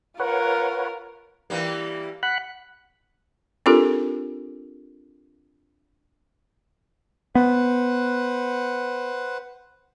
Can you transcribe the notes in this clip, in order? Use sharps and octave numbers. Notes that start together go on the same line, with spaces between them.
F4 A#4 B4 C#5 F#5
E3 G3 A#3
F#5 B5 F#6
C4 D4 F4 G4 A4 A#4
B3 B4 C5 F#5